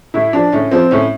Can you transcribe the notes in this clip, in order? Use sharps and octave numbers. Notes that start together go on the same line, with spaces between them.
A2 E4
F3 D4
A2 C#4
F3 C4
A2 C#4